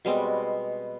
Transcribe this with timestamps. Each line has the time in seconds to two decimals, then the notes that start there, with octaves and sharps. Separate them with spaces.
0.05 B2 G3 G#3 C4